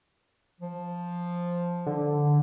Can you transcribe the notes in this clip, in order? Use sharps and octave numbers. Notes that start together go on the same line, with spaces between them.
F3
D3